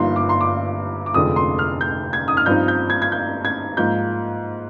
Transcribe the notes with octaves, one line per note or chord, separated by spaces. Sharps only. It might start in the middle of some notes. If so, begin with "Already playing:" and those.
Already playing: G1 G2 F3 A#3 D#4 C6
D6
C6
D6
D6
F1 F2 D3 G#3 D#6
C6
F6
G6
G#6
D#6
F6
G2 F3 C4 D#4 G6
G6
G#6
G#6
G6
G#6
G#2 F3 A#3 G6